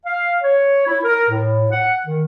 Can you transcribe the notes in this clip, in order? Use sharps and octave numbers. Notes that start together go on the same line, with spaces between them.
F5
C#5
E4
A#4
A2
F#5
D#3